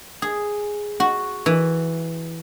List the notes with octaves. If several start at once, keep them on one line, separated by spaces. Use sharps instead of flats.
G#4
F#4
E3